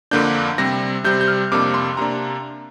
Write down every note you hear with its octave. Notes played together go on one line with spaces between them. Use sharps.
F2 D3 A#3 D4 G6
C3 G3 C4 A#6
C3 G3 C4 G6
G6
F6
F2 C3 A#3 D4 D6
C6
C3 A#3 D4 A#5